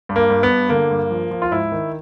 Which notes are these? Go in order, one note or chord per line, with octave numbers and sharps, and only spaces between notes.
G2
A#3
G2
B3
G2
D3 A#3
G2
F3
F3
F4
G#2 E4
D#3